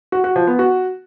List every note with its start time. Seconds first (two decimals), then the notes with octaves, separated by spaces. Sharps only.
0.12 F#4
0.24 F#4
0.36 F3
0.47 B3
0.59 F#4